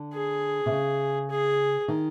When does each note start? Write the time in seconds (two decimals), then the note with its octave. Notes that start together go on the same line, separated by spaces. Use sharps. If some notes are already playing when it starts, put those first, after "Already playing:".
Already playing: D3
0.14 G#4
0.66 C3
0.72 C#3
1.30 G#4
1.88 D#3